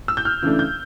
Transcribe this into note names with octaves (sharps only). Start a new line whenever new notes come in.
E6
G6
F6
C#3 E3 A3 D4
G6